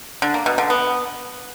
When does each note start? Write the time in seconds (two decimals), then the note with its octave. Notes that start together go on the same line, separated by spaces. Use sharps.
0.22 D3
0.34 A#3
0.46 B2
0.58 D3
0.70 B3